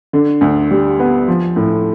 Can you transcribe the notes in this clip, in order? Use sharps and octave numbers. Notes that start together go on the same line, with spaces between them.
D3
D2
G3
B3
F3
A2